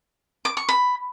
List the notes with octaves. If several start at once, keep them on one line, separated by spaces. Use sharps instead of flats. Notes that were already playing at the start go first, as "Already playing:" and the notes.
D6
C#6
B5